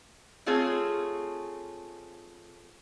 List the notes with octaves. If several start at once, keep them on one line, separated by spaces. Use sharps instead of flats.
A3 C4 F4 G#4 C#5